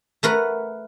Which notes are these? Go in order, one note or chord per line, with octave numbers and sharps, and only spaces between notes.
A3 A#4 B4 F#5